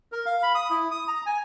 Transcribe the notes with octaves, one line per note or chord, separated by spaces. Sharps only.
A#4
F5
B5
D#6
E4
D#6
A#5
G#5